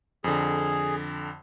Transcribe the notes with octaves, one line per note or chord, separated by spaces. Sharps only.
F2 D3 G#4